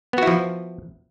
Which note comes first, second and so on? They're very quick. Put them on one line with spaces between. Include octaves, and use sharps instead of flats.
B3 F#4 E4 F3